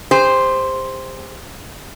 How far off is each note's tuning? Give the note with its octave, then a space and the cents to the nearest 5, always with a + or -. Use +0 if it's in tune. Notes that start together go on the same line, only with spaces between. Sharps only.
G4 +40 C5 +0